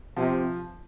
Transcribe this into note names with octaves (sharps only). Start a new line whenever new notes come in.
C3 F3